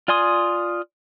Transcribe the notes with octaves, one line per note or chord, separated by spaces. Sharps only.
F4 D5 G#5 C6 D#6